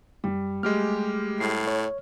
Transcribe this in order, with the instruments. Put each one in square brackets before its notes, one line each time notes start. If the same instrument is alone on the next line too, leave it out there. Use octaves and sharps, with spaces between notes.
[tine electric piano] F#2 [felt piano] G3
[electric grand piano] G#3 G4 F6 [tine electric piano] A3
[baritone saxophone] A2 [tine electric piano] C7
[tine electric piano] C#5